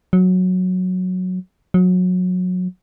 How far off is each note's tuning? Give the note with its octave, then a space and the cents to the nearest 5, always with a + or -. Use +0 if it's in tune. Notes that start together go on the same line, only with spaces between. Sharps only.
F#3 -10
F#3 -25